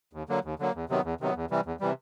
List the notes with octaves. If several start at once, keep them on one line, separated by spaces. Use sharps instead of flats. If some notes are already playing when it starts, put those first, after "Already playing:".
D#2
D3 F#3 A#3
D#2
D3 F#3 A#3
E2
C3 D#3 F#3 B3
E2
C3 D#3 F#3 B3
E2
C3 E3 G3
E2
C3 E3 G3